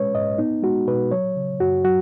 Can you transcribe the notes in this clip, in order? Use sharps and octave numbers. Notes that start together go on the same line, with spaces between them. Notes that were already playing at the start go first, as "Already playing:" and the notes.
Already playing: G#3 C#4 B4 C#5
G#2 D#5
B3 D#4
G#3 F#4
B2 B4
F#3 C#5
C#3
F#2 F#4
F#3 F#4